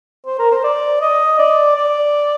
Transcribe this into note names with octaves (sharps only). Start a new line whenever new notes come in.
C5
A#4
C5
D5
D#5
D5
D5